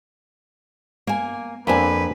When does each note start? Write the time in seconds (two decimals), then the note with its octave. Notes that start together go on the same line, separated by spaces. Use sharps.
1.07 A#3 G#5
1.67 F2 A#3 C4 D4 B4 G#5